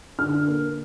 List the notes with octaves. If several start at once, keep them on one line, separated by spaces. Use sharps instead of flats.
D3 F6
A#3